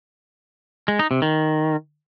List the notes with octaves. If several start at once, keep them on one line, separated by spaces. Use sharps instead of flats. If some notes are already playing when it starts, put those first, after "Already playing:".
G#3
D#4
C3
D#3